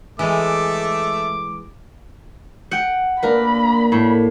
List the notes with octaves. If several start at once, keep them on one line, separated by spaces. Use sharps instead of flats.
E3 G#3 A3 D6
F#5 G5
A#2 A#3 D4 A#4 B4 B5
A2